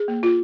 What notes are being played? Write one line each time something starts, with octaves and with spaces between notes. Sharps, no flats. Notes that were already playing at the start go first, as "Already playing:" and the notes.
Already playing: G#4
A#3
F4